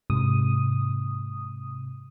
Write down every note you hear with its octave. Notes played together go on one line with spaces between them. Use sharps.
G#2 C3 D#6